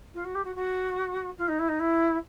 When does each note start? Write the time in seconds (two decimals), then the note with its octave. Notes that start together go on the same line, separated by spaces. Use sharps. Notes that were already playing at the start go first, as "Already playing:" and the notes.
0.14 F4
0.24 F#4
0.35 G4
0.44 F#4
0.55 F#4
1.38 F4
1.48 D#4
1.59 E4
1.68 D#4
1.79 E4